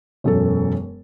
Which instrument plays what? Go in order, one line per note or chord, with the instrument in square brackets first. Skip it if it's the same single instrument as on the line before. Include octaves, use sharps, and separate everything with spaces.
[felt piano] E1 F#2 A4